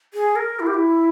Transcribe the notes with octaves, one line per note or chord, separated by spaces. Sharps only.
G#4
A#4
E4
G4
E4